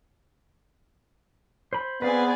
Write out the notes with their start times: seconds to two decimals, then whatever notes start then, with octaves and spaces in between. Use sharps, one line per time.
1.73 C5 B5
2.02 B3 C4 G#4 B4 D5 F5 G#5